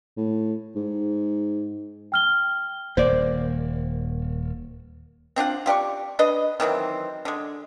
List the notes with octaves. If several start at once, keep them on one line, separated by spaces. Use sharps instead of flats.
A2
G#2
G5 F6 G7
D#1 A#3 C5 D5
C4 D4 F4 F#5
F4 G4 D5 C#6
D4 B4 D#5
D#3 E3 F#3 C4
D3 G#3